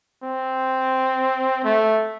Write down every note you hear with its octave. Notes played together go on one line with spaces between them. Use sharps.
C4
A3